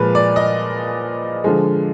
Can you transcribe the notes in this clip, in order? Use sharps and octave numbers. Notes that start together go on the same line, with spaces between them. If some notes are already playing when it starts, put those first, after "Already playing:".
Already playing: A#2 F3 G#3 B4
D5
D#5
D3 F3 G#3